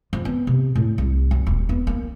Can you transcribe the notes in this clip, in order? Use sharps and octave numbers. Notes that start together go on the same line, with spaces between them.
F3
B3
C3
A2
C2
F#2
D#1
B3
A#3